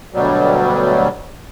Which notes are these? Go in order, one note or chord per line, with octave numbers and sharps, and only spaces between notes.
D2 B2 F#3 G3